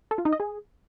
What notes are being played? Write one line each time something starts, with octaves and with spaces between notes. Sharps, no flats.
A4
F4
D#4
D#5
G#4